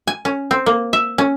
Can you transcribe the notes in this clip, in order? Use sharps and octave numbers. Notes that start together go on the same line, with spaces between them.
G#5
C#4
C4
A#3
E5
C#4